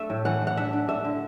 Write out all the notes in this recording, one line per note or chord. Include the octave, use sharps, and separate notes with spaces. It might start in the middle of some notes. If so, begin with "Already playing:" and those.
Already playing: A3 D4 E5
A2
E3 F#5
E3
F#5
D4 E5
D4
D4 E5
D3